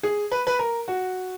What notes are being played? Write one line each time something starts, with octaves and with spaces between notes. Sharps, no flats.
G#4
B4
B4
A#4
F#4